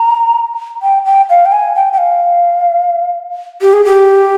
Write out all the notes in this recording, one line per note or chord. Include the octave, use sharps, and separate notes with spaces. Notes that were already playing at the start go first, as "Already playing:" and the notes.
Already playing: A#5
G5
G5
F5
G5
G#5
G5
G5
F5
G4
G#4
G4